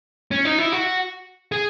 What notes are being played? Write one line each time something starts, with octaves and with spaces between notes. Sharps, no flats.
C#4
D#4
E4
F#4
G#4